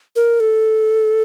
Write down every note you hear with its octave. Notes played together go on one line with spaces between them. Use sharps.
A#4
A4